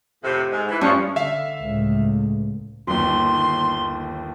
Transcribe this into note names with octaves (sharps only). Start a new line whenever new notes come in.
F2 A2 C3
G#2
E3
G2 C3 E3 F3 C#4 C#6
D3 E5 F5
C#2 A2
G1 D#2 C6